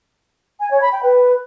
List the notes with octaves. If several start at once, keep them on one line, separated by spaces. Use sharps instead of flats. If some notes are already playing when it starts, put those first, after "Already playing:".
G#5
C#5
B5
G5
B4